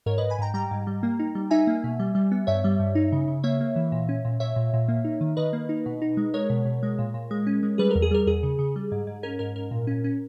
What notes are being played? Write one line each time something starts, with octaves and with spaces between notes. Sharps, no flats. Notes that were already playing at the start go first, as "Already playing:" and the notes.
G#2 A#4 C#5
G#2 B4 D#5
G#5 B5
G#2 G5 A#5
G3 G5 A#5
G#2
G3
A#3
D#4
G3
D#4 E5 G#5
A#3
B2
G3
G3
B3
G2 C#5 E5
G3
G2
D#4
C#3
C#3
A#3 C#5 E5
A#3
E3
A#2
C#4
A#2
A#2 C#5 E5
A#2
A#2
A#3
D#4
D#3
D#3 B4 D#5
A#3
D#4
B2
D#4
G#3
G#3 A#4 C#5
B2
B2
G#3
A#2
A#2
G#3
C#4
G#3
G3 G#4 B4
E2 A#4
G#4
G3 A#4
E2 G#4
C#3
C#3
G3
G#2
G#2
C#4 A#4
G#2 A#4
G#2 A#4
A#2
C#4
C#4